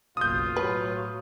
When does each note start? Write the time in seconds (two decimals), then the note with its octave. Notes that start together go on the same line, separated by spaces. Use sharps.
0.17 F#1 B1 F4 D#6 G6
0.56 A2 F#3 B4